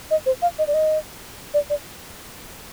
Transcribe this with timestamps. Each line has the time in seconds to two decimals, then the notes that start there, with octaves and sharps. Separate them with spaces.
0.11 D#5
0.26 C5
0.42 F5
0.58 D#5
0.67 D5
0.74 D#5
1.54 D5
1.70 D5